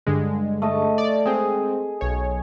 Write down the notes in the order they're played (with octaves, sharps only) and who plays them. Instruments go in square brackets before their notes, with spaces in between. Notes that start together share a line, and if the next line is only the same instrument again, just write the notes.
[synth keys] G2 D3 G#3
[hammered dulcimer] A3 D#5 A5
[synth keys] D5
[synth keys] G#3 C4 [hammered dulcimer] G#4
[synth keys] B1 C#5